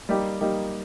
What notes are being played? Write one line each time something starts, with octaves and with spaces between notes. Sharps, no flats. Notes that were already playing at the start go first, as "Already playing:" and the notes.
G3 A#3 D#4 G4
G3 A#3 D#4 G4